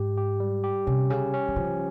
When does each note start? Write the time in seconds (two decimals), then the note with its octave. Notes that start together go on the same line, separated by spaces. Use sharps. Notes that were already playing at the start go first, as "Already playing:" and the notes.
Already playing: G#2 G4
0.18 G4
0.40 G3
0.64 G4
0.87 C3 C#4
1.10 C#3 C#4
1.33 C#4
1.48 D#3
1.56 C#3 F3